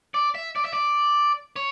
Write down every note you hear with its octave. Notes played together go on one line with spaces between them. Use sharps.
D5
E5
D5
E5
D5
C#5